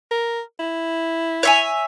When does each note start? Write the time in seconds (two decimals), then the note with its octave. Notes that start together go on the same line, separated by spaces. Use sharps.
0.11 A#4
0.60 E4
1.43 C#5 E5 G#5